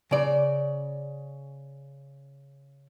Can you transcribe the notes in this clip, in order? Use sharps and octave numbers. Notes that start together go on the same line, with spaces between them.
C#3 D5